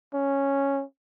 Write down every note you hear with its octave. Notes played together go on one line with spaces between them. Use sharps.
C#4